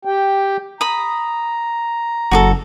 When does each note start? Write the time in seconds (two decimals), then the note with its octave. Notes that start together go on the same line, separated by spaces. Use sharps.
0.05 G4 G5
0.81 A#5 B5 D#6
2.31 F#1 F#4 G#4 A4